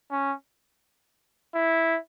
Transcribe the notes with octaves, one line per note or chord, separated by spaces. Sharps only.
C#4
E4